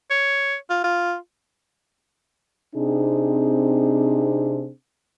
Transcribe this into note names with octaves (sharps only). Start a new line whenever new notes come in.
C#5
F4
F4
C3 C4 D4 D#4 G#4